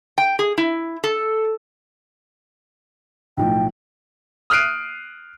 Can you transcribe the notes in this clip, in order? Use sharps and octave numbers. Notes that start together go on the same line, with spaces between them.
G5
G#4
E4
A4
B1 A2 F3 G5
D#6 F6 F#6 C7 D7 D#7